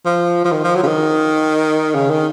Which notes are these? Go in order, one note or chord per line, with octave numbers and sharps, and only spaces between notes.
F3
F3
D#3
F3
F#3
C#3
D#3
C#3
D#3